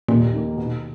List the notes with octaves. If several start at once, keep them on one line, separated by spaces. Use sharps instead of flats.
D#2 A#2
D#3 A#3
B2